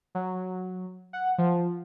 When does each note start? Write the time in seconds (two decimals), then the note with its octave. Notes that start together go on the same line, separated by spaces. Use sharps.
0.15 F#3
1.13 F#5
1.38 F3